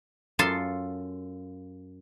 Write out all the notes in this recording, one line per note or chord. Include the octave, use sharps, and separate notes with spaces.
F#2 F4 A4 A5 C6